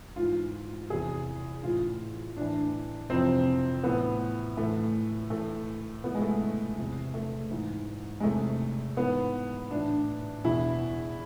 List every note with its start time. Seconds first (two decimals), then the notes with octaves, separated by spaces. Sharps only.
0.16 G#2 E3 F4
0.90 E2 C3 E3 G#4
1.63 A2 E3 F4
2.37 A2 E3 D4
3.10 F2 C3 E3 C4
3.83 A2 E3 B3
4.57 A2 E3 A3
5.30 A2 E3 A3
6.04 A2 E3 B3
6.15 G#3
6.22 A3
6.77 E2 C3 E3
7.14 A3
7.50 G#2 E3
8.20 G#3
8.23 E2 C3 E3 A3
8.97 G#2 E3 B3
9.71 A2 E3 D4
10.44 E2 B2 E4